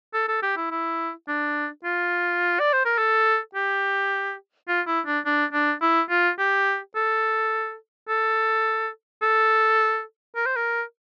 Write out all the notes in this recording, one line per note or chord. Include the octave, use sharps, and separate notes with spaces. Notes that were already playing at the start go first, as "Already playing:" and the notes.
A4
A4
G4
E4
E4
D4
F4
D5
C5
A#4
A4
G4
F4
E4
D4
D4
D4
E4
F4
G4
A4
A4
A4
A#4
C5
A#4